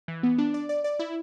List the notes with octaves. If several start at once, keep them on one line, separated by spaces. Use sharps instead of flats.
E3
B3
D4
D5
D5
D5
E4